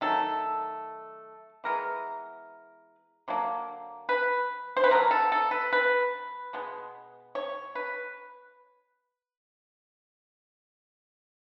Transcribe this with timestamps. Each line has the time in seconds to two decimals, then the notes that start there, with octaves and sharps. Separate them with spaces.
0.01 D#3 F#3 A3 A4
1.64 E3 G#3 B3 A#4
3.28 D3 F#3 A#3
4.09 B4
4.77 C5
4.84 B4
4.90 D3 F#3 B3 A#4
5.11 A4
5.32 A4
5.51 B4
5.73 B4
6.53 B2 G#3 B3
7.35 C#5
7.75 B4